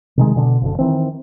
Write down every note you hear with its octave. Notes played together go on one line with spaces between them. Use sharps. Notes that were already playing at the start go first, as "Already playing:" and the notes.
C3 D#3 G#3
B2 D3
F#1 D3
D#3 E3 C4